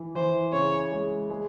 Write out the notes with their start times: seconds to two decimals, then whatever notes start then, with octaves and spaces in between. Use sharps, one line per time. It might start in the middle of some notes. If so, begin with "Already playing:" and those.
Already playing: E3
0.15 E3 C5
0.53 C#3 C#5
0.92 G#3
1.30 G#3